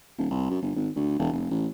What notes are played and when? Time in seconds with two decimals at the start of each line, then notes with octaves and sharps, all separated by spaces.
0.18 D#1
0.30 C2
0.50 F#2
0.62 G1
0.76 G#1
0.96 D2
1.19 E1
1.33 F1
1.51 A1